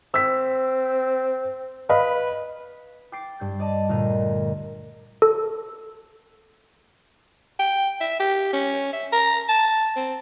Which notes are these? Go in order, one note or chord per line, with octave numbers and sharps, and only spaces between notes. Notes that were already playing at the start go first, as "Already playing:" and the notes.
C4 E6 B6
B4 D#5 F5 B5
G5 D6 G6 A6 C7 D7
G2 G6
D5 D#5 A5
D2 A#2 A#4 D#5
A4
G5
E5
G4
C#4
E5
A#5
A5
C4